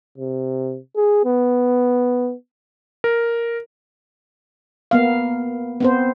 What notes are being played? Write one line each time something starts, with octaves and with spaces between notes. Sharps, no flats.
C3
G#4
B3
A#4
A#3 B3 F5
B3 C4 C5